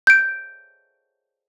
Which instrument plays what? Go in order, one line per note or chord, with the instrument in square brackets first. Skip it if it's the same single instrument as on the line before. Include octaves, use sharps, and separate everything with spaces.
[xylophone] G6 D7